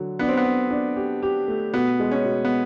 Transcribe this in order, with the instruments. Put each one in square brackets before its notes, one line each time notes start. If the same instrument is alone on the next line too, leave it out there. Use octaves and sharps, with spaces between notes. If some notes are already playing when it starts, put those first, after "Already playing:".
Already playing: [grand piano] D3 F#3
[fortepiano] B3 [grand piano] D4
[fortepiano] C4
B3
[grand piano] D4
D4
G4
G4
A3
[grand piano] B2 [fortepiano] B3
[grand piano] G#3
[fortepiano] C#4
[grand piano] B2
[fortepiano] B3